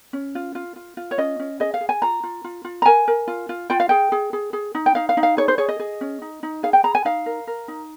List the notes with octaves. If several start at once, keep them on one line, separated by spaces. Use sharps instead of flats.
C#4
F4
F4
F4
F4
C#5
C#4 D#5
C#4
G#4 D#5
F5
G#4
G#5
F4 A#5
F4
F4
F4
A#5
A#4 G#5
A#4
F4
F4
F4 G5
F5
G#4 G5
G#4
G#4
G#4
D#4
G5
D#4 F5
F5
D#4
F5
G#4 C#5
C5
G#4 C#5
D#5
G#4
C#4
D#4
D#4
G#4 F5
G5
G#4 A#5
G#5
D#4 F5
A#4
A#4
D#4